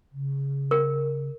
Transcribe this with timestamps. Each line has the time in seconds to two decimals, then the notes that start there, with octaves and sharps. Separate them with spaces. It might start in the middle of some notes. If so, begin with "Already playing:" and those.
0.13 C#3
0.71 A#4